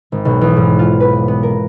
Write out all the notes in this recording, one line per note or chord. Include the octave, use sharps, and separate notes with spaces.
G#1
B1
E2
G#2
F4
B4
B3
A#4